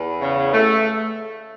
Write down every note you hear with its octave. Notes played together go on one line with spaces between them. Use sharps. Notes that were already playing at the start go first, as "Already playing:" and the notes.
Already playing: E2
C#3
A3